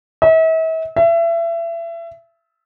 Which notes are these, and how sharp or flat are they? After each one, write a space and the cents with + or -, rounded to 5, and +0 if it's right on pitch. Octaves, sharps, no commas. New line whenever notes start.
E5 -40
E5 +30